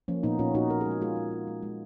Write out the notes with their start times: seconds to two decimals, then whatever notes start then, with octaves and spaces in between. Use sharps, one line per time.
0.08 F3 A#3 C#4
0.23 A#2 B3 D#4
0.39 A#2 C#4 F4
0.54 A#2 D#4 F#4
0.70 A#2 A#4
0.81 G#3 G#4
0.91 F#4
1.01 G#3 F4 G#4
1.16 G#3
1.31 G#3
1.47 G#3
1.62 G#3